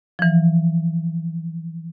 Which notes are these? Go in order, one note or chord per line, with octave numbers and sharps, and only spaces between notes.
E3 F3